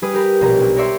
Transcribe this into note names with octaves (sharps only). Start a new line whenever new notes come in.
G3 G#4 B4 D#6
G4 A#4 B4
A#1 B2 A#4 B4 A#5
B1
A#4 C#5 D5 E5 C6